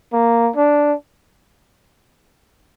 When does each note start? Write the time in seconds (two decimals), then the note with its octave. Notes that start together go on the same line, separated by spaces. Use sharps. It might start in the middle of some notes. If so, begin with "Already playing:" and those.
0.13 A#3
0.56 D4